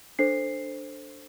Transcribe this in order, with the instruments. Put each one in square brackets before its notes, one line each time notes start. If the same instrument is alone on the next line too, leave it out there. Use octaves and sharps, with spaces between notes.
[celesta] D4 A4 C5 C7